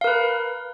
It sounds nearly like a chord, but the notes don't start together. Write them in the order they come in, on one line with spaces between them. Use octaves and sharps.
F5 A#4 B4